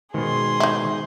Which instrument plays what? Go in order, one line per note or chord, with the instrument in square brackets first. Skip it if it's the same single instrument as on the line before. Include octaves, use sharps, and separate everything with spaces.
[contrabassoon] G#2 [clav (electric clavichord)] B2 D#3 [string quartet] G#4 C6
[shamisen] D#4 E4